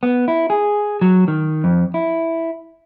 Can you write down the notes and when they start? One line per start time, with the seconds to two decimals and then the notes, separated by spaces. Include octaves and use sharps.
0.03 B3
0.28 E4
0.50 G#4
1.01 F#3
1.28 D#3
1.64 F2
1.94 E4